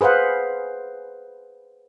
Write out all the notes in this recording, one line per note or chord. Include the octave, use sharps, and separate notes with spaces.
G#4 B4 C5 F5 F#5